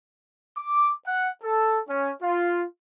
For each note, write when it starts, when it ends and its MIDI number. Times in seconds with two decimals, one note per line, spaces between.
0.57 0.93 86
1.07 1.30 78
1.44 1.80 69
1.89 2.13 61
2.22 2.65 65